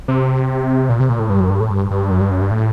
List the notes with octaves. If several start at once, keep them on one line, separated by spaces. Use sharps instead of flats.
C3
A#2
C3
A#2
A2
G2
F#2
G2
A2
G2
G2
F#2
G2
F#2
G2
A2